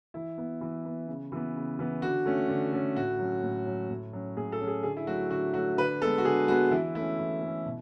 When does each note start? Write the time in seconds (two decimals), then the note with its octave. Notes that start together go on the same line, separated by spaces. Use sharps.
0.14 E3 E4
0.38 B3
0.61 E3
0.85 B3
1.08 C#3
1.32 E3 B3
1.55 C#3
1.79 E3 B3
2.02 D3 F#4
2.26 A3 C#4
2.49 D3
2.73 A3 C#4
2.96 A2 F#4
3.19 F#3 C#4
3.43 A2
3.66 F#3 C#4
3.90 A2
4.13 F#3 C#4
4.37 A2 G#4
4.52 A4
4.61 F#3 C#4
4.68 G#4
4.83 D3 G#4
4.97 E4
5.07 F#3 A3 F#4
5.30 D3 F#4
5.54 F#3 A3 F#4
5.77 D3 B4
6.01 B3 A4
6.04 G#3
6.18 F#4
6.25 D3 G#4
6.48 G#3 B3 F#4
6.71 E3 E4
6.95 A3 C#4 E4
7.19 E3
7.41 A3
7.47 C#4
7.66 B2